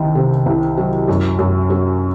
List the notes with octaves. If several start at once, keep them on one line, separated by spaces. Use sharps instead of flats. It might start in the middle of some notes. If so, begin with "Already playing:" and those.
Already playing: C2 D#3
C3
C2
F#3
F#2
F#2
F#3